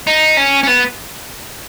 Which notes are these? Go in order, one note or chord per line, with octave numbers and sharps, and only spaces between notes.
D#4
C#4
C#4
B3